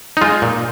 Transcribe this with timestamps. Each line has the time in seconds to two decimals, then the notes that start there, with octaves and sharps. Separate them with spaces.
0.17 D#4
0.22 G#3 F4
0.42 A#2